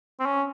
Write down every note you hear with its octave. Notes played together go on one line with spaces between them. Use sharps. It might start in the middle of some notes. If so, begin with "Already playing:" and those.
C4
C#4